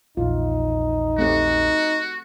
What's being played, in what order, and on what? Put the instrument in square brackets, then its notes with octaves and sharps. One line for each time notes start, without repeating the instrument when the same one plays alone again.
[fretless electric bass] A#1 E2 [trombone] D#4 [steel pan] F4
[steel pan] A3 C4 G4 [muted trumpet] F#4